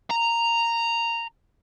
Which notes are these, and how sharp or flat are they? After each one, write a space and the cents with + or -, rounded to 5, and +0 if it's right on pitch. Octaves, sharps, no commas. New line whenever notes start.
A#5 -5